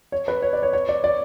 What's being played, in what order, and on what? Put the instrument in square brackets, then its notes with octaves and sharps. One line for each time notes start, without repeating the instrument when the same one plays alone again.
[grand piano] C#5
B4
C#5
D5
C#5
C#5
D5
D5